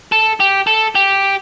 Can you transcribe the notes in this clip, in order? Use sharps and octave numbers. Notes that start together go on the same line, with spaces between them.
A4
G4
A4
G4